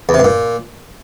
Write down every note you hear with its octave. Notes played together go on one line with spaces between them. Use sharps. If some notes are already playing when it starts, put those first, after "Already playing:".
E2
C3
G2
A#2